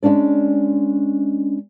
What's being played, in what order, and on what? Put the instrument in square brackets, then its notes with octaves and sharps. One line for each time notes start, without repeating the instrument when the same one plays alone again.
[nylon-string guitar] G#3 A#3 C#4 D4 D5